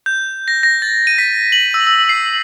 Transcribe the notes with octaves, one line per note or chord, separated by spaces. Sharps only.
G6
A#6
A#6
A6
D#7
B6
F#7
E6
E6
C7